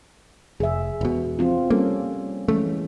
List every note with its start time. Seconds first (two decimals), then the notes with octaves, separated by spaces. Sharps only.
0.60 F1 G#4 E5
1.01 E1 B2
1.39 F3 C4 F4
1.70 G3 A#3 C#4 A4
2.48 E3 G#3 A3 C#4